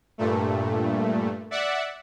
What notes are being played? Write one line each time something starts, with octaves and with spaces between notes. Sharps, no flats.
G2 A#2 A3
D5 E5 F#5